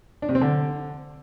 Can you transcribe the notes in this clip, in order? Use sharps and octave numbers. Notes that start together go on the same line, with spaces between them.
D4
C3
C4
D3